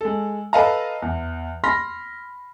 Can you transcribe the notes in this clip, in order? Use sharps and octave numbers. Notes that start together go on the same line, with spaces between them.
G#3 A4
A4 B4 D#5 F5 A5 A#5
E2
B5 C6 F6 A#6 B6